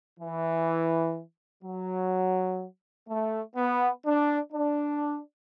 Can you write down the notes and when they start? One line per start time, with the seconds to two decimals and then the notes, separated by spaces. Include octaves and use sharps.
0.20 E3
1.64 F#3
3.08 A3
3.56 B3
4.05 D4
4.53 D4